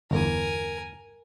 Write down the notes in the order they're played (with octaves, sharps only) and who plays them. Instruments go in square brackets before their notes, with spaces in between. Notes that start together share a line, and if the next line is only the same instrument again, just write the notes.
[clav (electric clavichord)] G1 E2 [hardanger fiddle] A#4 G#5